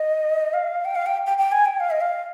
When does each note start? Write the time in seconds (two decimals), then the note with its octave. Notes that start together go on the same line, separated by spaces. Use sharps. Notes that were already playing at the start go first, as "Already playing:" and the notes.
Already playing: D#5
0.54 F5
0.85 G5
0.96 F5
1.06 G5
1.26 G5
1.38 G5
1.52 G#5
1.65 G5
1.80 F5
1.91 D#5
2.01 F5